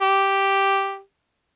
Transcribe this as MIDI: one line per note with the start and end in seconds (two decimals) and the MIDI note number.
0.02 0.99 67